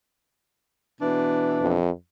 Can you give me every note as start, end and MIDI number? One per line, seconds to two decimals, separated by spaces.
1.00 1.77 47
1.00 1.77 52
1.00 1.77 62
1.61 1.90 41